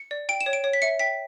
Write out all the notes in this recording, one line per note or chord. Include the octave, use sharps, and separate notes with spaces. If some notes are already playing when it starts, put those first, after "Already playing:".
Already playing: C#7
D5
G5 D7
E7
C#5
D7
C#5
B6
E5 C#7
G5 B6